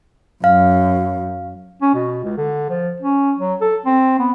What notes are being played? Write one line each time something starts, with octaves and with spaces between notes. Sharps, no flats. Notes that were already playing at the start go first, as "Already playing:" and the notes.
F#2 F5
C#4
B2
C#2
D3
F3
C#4
F#3
A4
C4
B3